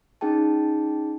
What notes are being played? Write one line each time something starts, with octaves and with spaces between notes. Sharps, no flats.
C#4 D#4 G#4 G5 A5